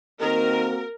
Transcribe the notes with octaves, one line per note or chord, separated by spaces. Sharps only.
D#3 A#3 C4 F#4 A#4